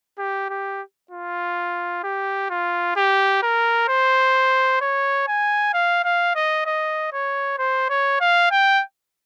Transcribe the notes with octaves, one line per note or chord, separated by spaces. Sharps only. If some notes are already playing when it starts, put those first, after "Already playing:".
G4
G4
F4
G4
F4
G4
A#4
C5
C#5
G#5
F5
F5
D#5
D#5
C#5
C5
C#5
F5
G5